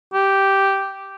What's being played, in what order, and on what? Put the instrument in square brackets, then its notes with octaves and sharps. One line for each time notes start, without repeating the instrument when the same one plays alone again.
[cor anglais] G4